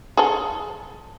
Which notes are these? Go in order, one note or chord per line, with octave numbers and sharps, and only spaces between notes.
G#4 A4